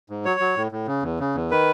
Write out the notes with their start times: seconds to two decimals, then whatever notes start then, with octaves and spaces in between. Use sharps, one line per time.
0.10 G#2
0.25 F#3 C#5
0.40 F#3
0.57 A2
0.72 A2
0.87 C#3
1.03 E2
1.20 C#3
1.35 E2
1.51 D#3 B4